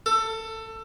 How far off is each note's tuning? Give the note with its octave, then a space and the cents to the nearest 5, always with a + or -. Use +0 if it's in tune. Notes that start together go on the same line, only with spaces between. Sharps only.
A4 +20